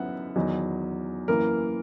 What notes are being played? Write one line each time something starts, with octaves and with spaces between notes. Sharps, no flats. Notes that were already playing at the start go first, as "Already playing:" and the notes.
Already playing: F#2 E3 B3 D#4 E5 F#5
E2 D#3 F#3
F#2 E3 A#3 E4 A#4